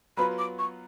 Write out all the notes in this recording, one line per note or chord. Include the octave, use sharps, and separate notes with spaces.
F#3 B3 F4 B4 B5
D6
C#6